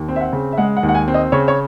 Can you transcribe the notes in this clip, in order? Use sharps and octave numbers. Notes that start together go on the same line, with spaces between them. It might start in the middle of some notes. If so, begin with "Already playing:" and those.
Already playing: D#2
C4
E5
F#5
C#3
E5
G#3 F#5
F#5
D#2
F#5
G#5
C4
D#5
C#3 C#5
C#5